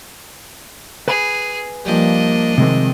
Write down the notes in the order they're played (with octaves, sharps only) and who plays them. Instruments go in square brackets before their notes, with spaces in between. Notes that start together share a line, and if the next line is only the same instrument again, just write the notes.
[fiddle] G#4 [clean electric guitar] B4 G#5 B5
[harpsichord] F3 G3 [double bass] A#3 [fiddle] D4 D#5
[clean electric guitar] C3 G#3 C4 [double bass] D#3